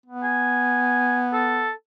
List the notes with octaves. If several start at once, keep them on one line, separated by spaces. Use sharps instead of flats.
B3
G#5
A4